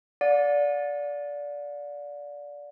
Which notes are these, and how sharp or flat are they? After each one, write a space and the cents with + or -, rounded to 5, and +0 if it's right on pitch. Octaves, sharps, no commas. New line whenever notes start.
D5 -15 F#5 -45